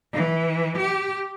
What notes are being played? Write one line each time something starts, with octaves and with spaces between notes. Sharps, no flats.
E3
G4